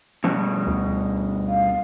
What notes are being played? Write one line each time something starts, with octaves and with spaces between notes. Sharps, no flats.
G2 B2 F3
D2
F5